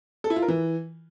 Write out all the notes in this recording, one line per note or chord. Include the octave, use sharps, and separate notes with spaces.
A4
E4
F4
A#4
E3